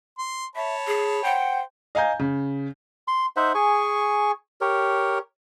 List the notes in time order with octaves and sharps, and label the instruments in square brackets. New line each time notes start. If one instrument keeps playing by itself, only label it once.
[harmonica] C6
[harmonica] C#5 A5 B5 [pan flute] E5
[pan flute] G#4
[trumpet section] C5 G5 [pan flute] F#5
[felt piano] D#5 F5 G#5 A#5 G6
C#3
[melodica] C6
D#4 C5 E5 F#5
G#4 G#5 C#6
G4 A#4 C#5